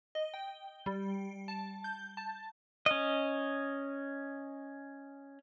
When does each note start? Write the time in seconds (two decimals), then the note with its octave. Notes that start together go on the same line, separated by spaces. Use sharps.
0.15 D#5
0.34 G5
0.86 G3
1.48 A5
1.84 G6
2.17 A5
2.86 C#4 D#5